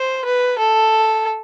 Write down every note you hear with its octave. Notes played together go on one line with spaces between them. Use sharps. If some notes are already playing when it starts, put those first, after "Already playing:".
Already playing: C5
B4
A4